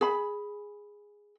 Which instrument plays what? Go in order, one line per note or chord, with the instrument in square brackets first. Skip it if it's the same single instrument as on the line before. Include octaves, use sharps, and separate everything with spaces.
[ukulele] G#4 B5